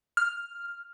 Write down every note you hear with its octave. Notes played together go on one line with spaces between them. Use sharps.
F6